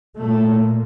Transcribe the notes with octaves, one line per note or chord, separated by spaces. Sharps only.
A#2 A3